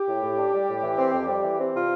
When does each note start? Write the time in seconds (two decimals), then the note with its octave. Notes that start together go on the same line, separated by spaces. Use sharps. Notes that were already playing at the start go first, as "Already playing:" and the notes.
Already playing: G4
0.09 A2
0.23 A2
0.38 D4
0.54 G3
0.69 A2
0.83 E3
0.98 C4
1.13 F2
1.28 G3
1.44 E3
1.59 C4
1.73 C3 F4